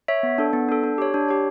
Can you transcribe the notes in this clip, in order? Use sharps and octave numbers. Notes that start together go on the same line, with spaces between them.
C#5 E5
B3
D4 A4
B3
D4 A4
D4
G4 C#5
D4
G4 C#5